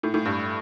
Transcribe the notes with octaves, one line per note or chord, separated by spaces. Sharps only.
A2
A2
G2